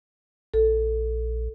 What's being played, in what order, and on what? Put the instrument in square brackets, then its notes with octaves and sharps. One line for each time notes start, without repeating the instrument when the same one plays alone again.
[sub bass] A#1 [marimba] A4